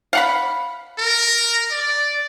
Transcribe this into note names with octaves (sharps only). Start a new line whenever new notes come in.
F5 F#5 B5
A#4
D5